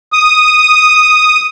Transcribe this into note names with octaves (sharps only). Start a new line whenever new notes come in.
D#6